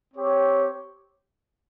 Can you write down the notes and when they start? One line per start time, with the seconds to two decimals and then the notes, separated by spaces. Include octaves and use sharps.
0.14 C4 G4 C#5